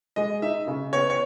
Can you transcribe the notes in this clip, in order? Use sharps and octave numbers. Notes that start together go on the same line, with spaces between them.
G#3 D#5
D#4 E5
C#3
B3 C#5
C#5